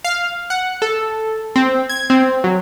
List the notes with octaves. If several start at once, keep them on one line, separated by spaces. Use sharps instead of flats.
F5
F#5
A4
C4
G#6
C4
F#3